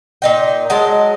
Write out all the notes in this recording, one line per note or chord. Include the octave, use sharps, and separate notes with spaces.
A#2 D#4 G5
F#3 G#3 D#5 A5